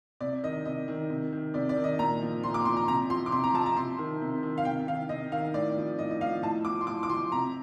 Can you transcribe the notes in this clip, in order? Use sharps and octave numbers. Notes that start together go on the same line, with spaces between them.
C3 D5
D#3 D#5
C3 D#5
D#3
C3
D#3
C3 D5
D5
D#3
D#5
A#2 A#5
F3
A#2 C6
D6
F3 C6
A#5
C3 A#5
F3 C6
D6
C3 C6
A#5
F3 A5
A#5
C3 C6
D#3
C3
D#3
F5
C3 G5
D#3 F5
C3 D#5
D#3 F5
A2 D5
F3
A2 D#5
D#5
F3 F5
A2 A5
F3 D6
C6
A2 D6
D6
F3 C6
C3 A#5